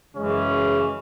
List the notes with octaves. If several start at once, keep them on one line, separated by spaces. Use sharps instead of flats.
F#2 C#3 E3 G#3 C#4